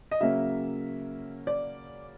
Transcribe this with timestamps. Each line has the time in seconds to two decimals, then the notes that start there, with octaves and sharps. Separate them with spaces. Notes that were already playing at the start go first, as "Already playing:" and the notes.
0.11 D#5
0.21 C#3 F#3 A#3 C#4 E5
1.47 D5